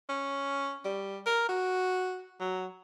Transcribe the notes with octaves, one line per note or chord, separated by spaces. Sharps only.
C#4
G3
A#4
F#4
F#3